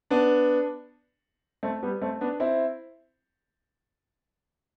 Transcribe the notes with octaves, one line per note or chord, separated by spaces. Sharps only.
B3 D4
A3 C4
G3 B3
A3 C4
B3 D4
C4 E4